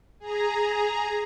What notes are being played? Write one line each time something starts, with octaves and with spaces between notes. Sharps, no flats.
G#4 A#5